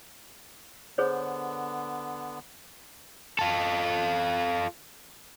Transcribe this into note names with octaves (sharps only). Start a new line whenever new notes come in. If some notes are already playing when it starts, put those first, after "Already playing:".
D3 B3 G#4 C5 C#5
F4 A4